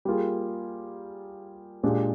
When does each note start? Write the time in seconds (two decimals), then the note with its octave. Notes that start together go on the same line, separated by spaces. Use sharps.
0.05 G3 A#3 F4 G#4
1.83 A#2 G#3 D4 G4